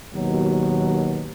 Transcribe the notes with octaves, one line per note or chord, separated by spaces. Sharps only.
D#2 B2 F#3